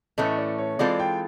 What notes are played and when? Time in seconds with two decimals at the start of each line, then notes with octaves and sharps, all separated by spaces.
0.18 A2 E3 A3 C#4 D#5
0.38 D5
0.58 C#5
0.79 E3 G#3 C4 F4 A4 D5
1.00 G5